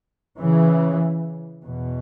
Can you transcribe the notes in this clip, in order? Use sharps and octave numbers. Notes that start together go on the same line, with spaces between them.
C#3 E3
E2 B2